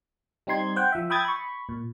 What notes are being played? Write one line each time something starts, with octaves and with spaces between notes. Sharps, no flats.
G3 C4 D#4 C6 G#6
C5 F#5 G5
F3 E5
E5 G5 B5 D#6 G#6 A6
B5 C#6
A#2